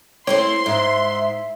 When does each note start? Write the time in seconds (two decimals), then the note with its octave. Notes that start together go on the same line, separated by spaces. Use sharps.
0.27 A3 C4 E4 C#5 C6
0.66 G#2 E5